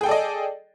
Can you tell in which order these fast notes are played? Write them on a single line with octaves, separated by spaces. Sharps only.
G#4 G5 A4 D5 D#5